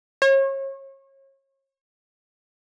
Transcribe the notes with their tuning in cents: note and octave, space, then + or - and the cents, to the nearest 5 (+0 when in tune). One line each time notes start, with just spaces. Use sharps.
C#5 -35